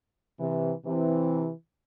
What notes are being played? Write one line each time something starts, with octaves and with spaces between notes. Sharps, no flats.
C3 E3
C3 E3